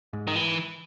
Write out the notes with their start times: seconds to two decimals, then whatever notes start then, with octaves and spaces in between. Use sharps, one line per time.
0.13 G#2
0.28 D#3
0.35 E3